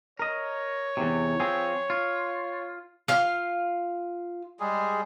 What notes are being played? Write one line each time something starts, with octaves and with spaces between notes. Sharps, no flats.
A#4 C#5 D#5
E2 G#2 C3
F3 C4 G#4
F4
F4 F5
G3 G#3 G#4